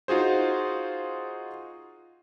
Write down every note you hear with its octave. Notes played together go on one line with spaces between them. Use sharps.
D#4 F4 F#4 G#4 C5